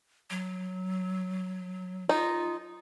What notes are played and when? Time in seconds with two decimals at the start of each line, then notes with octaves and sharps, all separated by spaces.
0.30 F#3
2.09 D#4 F4